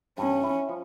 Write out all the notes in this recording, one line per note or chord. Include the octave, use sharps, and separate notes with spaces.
G2 C#4
E4
F3